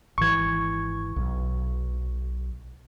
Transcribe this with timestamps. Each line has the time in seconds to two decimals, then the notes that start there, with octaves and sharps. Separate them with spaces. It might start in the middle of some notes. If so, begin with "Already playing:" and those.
0.18 G#1 E3 C#6 G#6
1.16 B1